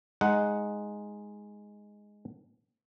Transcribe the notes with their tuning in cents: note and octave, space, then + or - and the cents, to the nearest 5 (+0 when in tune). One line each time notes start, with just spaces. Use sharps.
G#3 +0 D#4 +0 F#5 +0